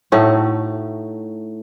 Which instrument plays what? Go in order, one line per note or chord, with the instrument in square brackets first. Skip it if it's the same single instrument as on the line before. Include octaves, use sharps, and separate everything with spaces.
[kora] A2 A3 D#4 F#4